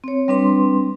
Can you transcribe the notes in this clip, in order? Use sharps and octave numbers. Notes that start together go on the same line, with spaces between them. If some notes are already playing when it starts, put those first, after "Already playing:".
C4 C#5
G3 C4 D4 B4 C6